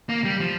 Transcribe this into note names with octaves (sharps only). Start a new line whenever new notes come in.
A#3
G3
F3